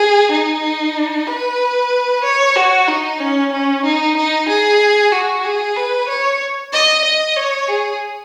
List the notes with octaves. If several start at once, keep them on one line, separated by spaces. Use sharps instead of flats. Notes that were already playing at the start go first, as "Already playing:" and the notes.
Already playing: G#4
D#4
B4
C#5
F#4
D#4
C#4
C#4
D#4
D#4
G#4
F#4
G#4
B4
C#5
D#5
D#5
C#5
G#4